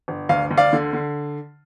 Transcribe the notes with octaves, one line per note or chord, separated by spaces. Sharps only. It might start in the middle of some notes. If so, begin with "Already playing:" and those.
G1
D2 F5
D2
D5 F5
D3
D3